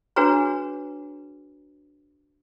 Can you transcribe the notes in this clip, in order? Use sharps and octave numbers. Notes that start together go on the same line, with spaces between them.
D4 F#4 G#4 B4 C#5 A#5